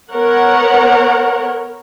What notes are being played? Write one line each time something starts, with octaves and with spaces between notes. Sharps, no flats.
B3 A#4 C#5 F#5